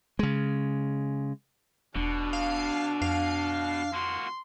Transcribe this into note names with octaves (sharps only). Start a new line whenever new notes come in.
C#3 G#3
E1 B2 D4
F5
F2 F5
A#3 F#4 C6